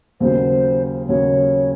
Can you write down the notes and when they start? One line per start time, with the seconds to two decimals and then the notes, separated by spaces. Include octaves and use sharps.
0.20 D#2 C#3 F#3 C5
1.09 D#2 C#3 F#3 C#5